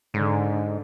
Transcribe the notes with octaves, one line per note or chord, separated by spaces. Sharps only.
G#2 D3